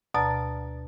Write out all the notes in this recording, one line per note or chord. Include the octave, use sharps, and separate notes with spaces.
D2 B2 D5 A5 A#5 A6